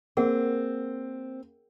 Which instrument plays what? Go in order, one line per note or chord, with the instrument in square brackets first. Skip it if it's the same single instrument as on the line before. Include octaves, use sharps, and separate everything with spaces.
[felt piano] A#3 [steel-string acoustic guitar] C4 [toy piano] G#4 A#4 F#5